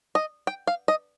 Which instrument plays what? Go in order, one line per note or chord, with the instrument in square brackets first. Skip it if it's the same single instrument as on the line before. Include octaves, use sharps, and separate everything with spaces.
[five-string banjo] D#5
G5
F5
D#5